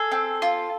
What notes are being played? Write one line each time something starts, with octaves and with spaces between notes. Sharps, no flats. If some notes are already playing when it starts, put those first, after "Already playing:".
Already playing: G#4 A4
C4
F4